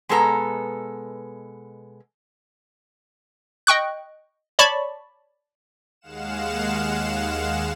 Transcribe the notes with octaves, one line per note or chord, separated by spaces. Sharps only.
B2 G#3 B3 A4 C#5 A#5
D#5 G5 C#6 F#6
C#5 D5 A5 B5 C#6
D#2 G#3 F5 F#5 E7